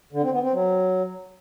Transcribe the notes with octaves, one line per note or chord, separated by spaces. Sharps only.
D3
C4
B3
C4
F#3